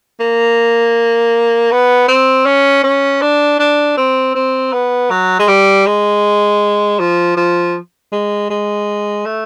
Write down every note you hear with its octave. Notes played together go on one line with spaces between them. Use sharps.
A#3
B3
C4
C#4
C#4
D4
D4
C4
C4
B3
F#3
G#3
G3
G#3
F3
F3
G#3
G#3
A3